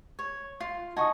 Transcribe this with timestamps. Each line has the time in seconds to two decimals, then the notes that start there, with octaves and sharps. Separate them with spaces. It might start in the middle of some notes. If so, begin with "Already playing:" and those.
0.19 C#5
0.60 F4
0.96 D#4 F#4 G#5 A5 C#6 D#6